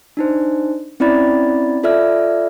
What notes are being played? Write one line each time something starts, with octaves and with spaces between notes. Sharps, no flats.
D4 D#4 C5
C4 C#4 E4 D5 B5 A6
F4 A4 D5 E5 F6